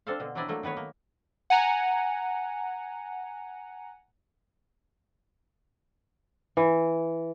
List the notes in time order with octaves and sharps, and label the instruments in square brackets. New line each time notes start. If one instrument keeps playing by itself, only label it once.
[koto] C4 D4 A4 C5 F5
B2 D3
F#3 C4 D4 E4 D5 D#5
F#3 A3 A#3
D#3 B3 B4 C#5
A#3
[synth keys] F#5 G#5 A#5
[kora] E3